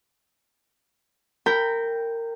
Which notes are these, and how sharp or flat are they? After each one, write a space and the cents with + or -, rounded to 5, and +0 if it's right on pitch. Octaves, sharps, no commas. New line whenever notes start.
A#4 -20 G5 +0 B5 +5